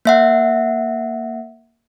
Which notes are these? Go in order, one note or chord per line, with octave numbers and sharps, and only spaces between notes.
A#3 E5 F#5